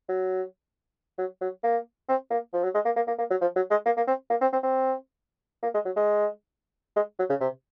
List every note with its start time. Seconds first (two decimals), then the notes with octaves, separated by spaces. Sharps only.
0.09 F#3
1.18 F#3
1.41 F#3
1.64 A#3
2.08 C4
2.31 A#3
2.53 F3
2.64 F#3
2.75 G#3
2.85 A#3
2.96 A#3
3.07 A#3
3.18 A#3
3.30 F#3
3.41 F3
3.56 F#3
3.71 G#3
3.86 A#3
3.97 A#3
4.08 C4
4.30 A#3
4.41 C4
4.53 C4
4.63 C4
5.63 A#3
5.74 G#3
5.85 F#3
5.96 G#3
6.96 G#3
7.19 F#3
7.29 C#3
7.40 C3